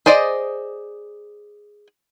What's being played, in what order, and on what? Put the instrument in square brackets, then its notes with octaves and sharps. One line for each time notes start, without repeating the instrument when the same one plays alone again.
[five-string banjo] G#4 C5 D5 D#5